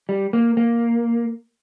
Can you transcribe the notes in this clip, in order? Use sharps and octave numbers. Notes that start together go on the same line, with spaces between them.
G3
A#3
A#3